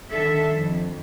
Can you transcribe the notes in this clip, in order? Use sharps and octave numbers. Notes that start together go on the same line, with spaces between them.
D3 D#3 D4 A4 E5
F2